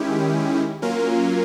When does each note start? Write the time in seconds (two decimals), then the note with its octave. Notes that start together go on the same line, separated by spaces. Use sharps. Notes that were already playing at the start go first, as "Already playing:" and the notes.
Already playing: D#3 G#3 C#4 E4 G4
0.82 F#3 A#3 C#4 F4 A#4